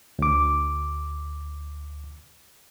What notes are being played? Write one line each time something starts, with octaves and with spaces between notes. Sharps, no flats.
D2 D6